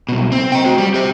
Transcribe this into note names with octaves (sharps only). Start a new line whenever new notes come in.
C2 B2
C4
D#5 G5
F#4 C5
G3
G4 C5